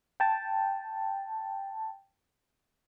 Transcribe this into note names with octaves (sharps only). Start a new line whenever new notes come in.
G5 A5